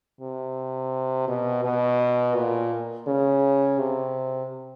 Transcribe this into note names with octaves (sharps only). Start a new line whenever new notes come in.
C3
B2
B2
A#2
C#3
C3